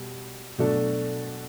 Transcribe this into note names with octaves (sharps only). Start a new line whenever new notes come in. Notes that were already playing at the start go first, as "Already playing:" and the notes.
Already playing: B2 G3
B2 F#3 A3 D4 A4